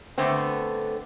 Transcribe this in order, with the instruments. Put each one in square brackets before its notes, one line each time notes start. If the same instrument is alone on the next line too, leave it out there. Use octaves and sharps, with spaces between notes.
[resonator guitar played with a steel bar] D3 A3 B3 C4